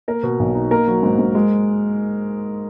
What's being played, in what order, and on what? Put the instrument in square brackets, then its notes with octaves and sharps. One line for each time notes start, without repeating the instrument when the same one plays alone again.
[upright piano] A#3 A#4
B2
B1
D#4
A#3 A#4
F#3
G#2
G#2
G#3